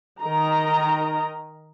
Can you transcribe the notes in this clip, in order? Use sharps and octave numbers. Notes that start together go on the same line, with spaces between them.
D#3 A#4 D#5 A#5